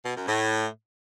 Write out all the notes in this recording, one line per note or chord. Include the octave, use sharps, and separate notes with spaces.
B2
F#2
A2